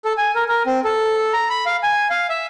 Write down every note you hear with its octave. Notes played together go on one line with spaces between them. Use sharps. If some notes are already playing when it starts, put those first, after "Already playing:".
A4
G#5
A#4
A#4
C4
A4
A#5
B5
F5
G#5
F5
E5